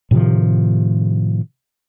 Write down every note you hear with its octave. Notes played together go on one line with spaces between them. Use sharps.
A2 C3 D#3 F3